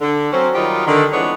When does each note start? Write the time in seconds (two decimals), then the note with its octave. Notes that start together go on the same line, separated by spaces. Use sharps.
0.01 D3
0.32 F#3 C4 C#4
0.55 D#3 F#3 G3 D#4 F4 G4
0.86 D3 D#3
1.13 F2 E3 G#3 B3 D4 C#5